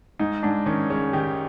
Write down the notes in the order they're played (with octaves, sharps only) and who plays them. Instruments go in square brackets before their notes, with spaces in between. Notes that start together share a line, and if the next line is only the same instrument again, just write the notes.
[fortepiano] G#2 [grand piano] D#4
[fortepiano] G#2 [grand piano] D4
[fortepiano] D#3 [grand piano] C#4
[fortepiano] G#3 [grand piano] C#4
[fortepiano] D#3 [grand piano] G4